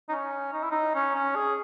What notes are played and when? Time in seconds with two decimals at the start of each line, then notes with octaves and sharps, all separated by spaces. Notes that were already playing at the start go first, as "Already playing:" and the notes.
0.09 D#4
0.12 C#4
0.53 D#4
0.63 E4
0.71 D#4
0.95 C#4
1.15 C#4
1.35 G#4